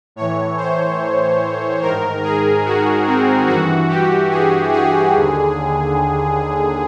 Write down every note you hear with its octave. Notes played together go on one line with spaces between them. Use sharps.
A2 E3 C#5
C5
G#2 D#3 A#4
G#4
F#4
C4
G2 E3 F#4
G4
G#4
G#4
D#2 D3